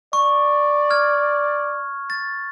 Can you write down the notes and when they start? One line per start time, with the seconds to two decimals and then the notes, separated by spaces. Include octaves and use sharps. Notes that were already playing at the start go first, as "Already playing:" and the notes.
0.13 D5 C#6
0.90 F6 G#6
2.10 A6